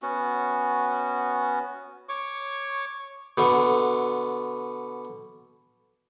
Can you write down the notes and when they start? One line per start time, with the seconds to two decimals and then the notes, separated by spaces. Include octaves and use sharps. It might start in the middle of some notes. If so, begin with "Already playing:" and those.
0.02 B3 C#4 F#4
2.09 C#5 C#6 D6
3.38 B2 D3